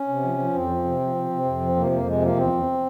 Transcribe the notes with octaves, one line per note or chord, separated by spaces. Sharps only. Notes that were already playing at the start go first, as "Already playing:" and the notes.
Already playing: C#4
C3
F3
F3
F2 C4
F3
C3
F3
C3
C3
F2
F3
C3 A#3
F2 A#3
C3 G#3
F3 A#3
E2 C4
E2